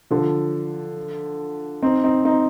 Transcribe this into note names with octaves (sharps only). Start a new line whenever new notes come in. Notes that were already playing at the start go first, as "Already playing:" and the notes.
D3 F3
C4 D#4
C4 D#4
C4 D#4